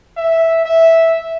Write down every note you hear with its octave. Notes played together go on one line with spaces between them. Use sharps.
E5
E5